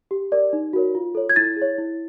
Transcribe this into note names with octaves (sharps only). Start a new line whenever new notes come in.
G4
A#4 D5
D#4
F#4 A#4 C#5
F4
A4 C#5
G#6
E4 A6
G#4
C#5
E4